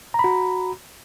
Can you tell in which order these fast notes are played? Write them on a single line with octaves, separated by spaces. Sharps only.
A#5 B5 F#4